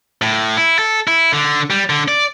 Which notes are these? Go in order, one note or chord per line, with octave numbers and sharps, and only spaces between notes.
A2
E4
A4
E4
D3
G3
D3
D5